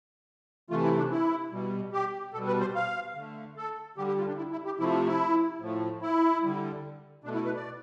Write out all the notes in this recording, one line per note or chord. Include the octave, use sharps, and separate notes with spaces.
C3 E3 A3 F4
E4
D4
E4
B2 G3
G4
B2 G3 A4
B4
C5
F5
D3 A3
A4
D3 G3 G4
G4
F4
D4
E4
E4
G4
C3 F3 A3 E4
E4
A2 F3 A3
E4
D3 G3
B2 A3 D4
E4
B4
D5